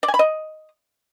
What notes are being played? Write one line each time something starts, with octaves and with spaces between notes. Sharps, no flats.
D5
G#5
B5
D#5